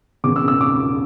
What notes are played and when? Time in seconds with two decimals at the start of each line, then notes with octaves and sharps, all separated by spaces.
0.24 E1 E2 C#3 D6
0.36 E6
0.48 E6
0.61 D6